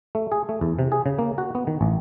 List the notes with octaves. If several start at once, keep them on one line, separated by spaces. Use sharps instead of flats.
A3
G#4
A3
E2
C3
G#4
C#3
A#3
F#4
B3
D#3
A1